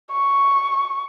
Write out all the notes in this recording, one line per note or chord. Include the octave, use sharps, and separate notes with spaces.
C#6